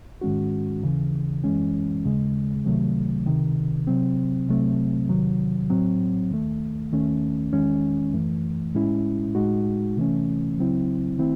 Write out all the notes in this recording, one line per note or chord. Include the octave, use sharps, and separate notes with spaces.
G#2 D#3 G#3 C#4 F#4
D#2 C#3 E3
F#2 E3 G#3 C#4
D#2 C#3 G#3
C#2 C3 D#3 F#3 A3
C#2 C3 D#3
C3 F#3 C4
C2 C3 F#3 A3 C4
E2 C3 D#3 F#3
A2 F#3 C4
D#2 D#3 A3
D#2 D#3 A3 C#4
E2 D#3 G#3 C#4
F#2 E3 A3
A2 G#3 C#4 E4
A2 G#3 D#4 F#4
C3 E3 A3 C#4
C#2 C#3 F#3 C4 E4
D#3 A3 C4 E4